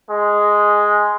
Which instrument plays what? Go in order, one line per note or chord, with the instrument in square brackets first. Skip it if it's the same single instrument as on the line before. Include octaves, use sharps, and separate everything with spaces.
[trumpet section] G#3